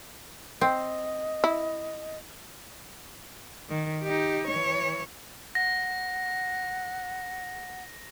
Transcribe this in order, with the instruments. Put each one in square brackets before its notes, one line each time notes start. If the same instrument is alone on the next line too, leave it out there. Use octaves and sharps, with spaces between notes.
[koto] C4 [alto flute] D#5
[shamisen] E4
[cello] D#3
D#4 G4
E3 C#5
[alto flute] F#5 [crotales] A#6